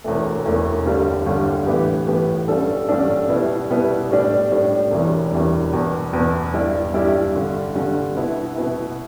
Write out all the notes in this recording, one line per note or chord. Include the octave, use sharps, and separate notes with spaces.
E1 E2 E3 A3
E1 E2 E3 A3
G1 G2 D3 G3
G1 G2 D3 G3
A2 E3 B3 G4
A2 E3 B3 G4
A1 G2 G3 D4 A4
A1 G2 G3 D4 A4
B2 G3 B3 E4
B2 G3 B3 E4
A2 G3 D4
A2 G3 D4
E1 E2 E3 G3
E1 E2 E3 G3
E2 B2 B3
E2 B2 B3
G2 G3 E4 G4 D5
G2 G3 E4 G4 D5
G2 D3 G3
G2 D3 G3
B2 B3 E4
B2 B3 E4